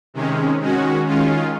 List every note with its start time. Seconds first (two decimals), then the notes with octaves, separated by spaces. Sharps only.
0.14 C3 D#3 G#3 C#4
0.60 D#3 G#3 C#4 F#4
1.06 D#3 G#3 C#4 F4